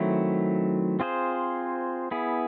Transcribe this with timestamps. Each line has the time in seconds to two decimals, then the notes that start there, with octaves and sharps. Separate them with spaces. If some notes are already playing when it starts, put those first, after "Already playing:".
Already playing: D#3 F#3 A3 C4 E4
1.00 C4 F4 G#4 C5
2.11 B3 E4 G#4